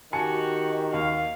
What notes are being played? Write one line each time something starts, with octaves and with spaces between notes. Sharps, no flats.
D#3 F#4 G4 G#5 A5 C#7
D#2 F5